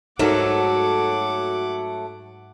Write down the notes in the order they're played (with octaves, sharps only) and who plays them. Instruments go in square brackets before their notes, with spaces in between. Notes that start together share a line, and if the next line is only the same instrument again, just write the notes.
[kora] G#2 [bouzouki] F#3 A3 [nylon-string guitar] F#4 A4 A#4 [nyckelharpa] F#5 D6